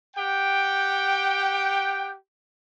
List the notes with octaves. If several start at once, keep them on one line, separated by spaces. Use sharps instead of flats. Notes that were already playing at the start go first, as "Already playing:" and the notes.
G4 F#5 G5